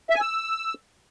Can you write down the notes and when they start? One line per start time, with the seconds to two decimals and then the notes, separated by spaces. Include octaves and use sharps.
0.10 E5
0.15 G#5
0.21 E6